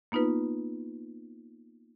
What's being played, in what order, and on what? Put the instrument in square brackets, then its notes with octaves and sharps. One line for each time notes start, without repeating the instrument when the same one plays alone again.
[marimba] A#3 B3 D#4 F4 B4